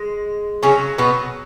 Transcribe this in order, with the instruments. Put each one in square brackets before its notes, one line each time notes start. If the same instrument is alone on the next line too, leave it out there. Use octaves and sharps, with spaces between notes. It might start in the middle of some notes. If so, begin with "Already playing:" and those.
Already playing: [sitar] G#3
[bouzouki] C#3 C#4 [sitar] F#3
[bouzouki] B2 B3